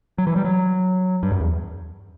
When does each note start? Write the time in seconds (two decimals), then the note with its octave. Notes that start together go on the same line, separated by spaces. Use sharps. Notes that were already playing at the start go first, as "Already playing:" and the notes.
0.18 F#3
0.27 E3
0.36 G3
0.44 F#3
1.23 G2
1.32 F#2
1.41 E2